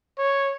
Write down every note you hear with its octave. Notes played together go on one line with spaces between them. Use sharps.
C#5